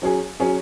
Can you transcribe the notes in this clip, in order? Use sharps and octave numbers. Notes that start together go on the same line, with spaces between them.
F#3 C#4 G#4
F#3 C#4 G#4